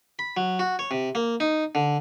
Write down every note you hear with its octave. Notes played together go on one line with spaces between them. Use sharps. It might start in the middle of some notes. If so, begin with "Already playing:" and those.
B5
F#3
F#4
C#5
C3
A#3
D#4
D3